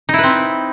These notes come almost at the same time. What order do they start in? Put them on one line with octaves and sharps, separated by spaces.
D#4 E4 B4 C4